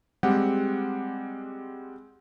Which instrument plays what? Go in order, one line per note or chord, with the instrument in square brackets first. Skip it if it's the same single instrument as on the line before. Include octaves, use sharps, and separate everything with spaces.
[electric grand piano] G3 G#3 C4 G4 F#5